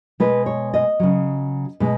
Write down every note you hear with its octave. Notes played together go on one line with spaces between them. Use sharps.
B2 G#3 B4
C#5
D#5
C#3 F#3
B2 G#3